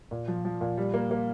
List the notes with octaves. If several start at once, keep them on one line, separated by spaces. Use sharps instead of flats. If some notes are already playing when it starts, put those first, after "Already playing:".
A#2
F3
F3
A#2
G3
A#3
A#3